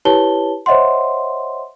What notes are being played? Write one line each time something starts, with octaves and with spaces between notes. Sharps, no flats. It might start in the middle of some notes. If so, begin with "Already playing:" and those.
E4 G4 B4 C#5 A5 G7
C5 C#5 D#5 E5 F#5 C6